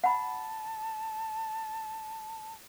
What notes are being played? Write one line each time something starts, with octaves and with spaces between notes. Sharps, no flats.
F#5 A5 B5